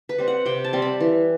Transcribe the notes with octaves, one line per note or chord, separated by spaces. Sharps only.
B4
G3 C4
F#5
C3 G5
A5
G3 C4
B5
E3